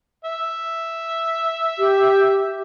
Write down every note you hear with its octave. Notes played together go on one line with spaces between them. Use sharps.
E5
G4